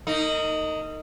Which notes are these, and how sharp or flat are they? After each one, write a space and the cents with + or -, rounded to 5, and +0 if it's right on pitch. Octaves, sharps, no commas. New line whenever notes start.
A#3 -40 D#4 +0